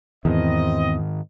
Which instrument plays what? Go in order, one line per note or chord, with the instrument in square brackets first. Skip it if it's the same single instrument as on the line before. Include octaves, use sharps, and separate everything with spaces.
[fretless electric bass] E2 [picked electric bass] G#2 D#3 [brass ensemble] C4 D#5